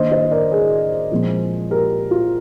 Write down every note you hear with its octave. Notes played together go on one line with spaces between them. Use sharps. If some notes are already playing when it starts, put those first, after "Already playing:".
Already playing: D#3 A#3 D4 C5 D#5
C5 D#5
A#4 D5
G#4 C5
A#2 F3 G#3 C4
G4 A#4
F4